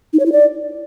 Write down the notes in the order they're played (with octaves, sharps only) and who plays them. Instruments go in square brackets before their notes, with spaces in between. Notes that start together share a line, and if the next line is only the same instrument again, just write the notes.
[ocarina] D#4
C#5
E4
D5